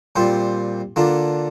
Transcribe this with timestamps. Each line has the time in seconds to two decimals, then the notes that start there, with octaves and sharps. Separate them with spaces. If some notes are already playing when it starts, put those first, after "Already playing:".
0.16 A#2 G3 C4 F4 C5
0.96 D3 A#3 D4 F4